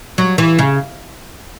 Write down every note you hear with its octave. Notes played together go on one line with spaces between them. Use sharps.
F#3
E3
C#3